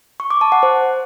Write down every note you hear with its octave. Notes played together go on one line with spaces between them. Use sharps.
C#6
D6
A5
F#5
C5